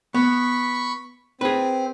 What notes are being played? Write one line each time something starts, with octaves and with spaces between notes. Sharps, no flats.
B3 B5 C#6
C4 G#4 B4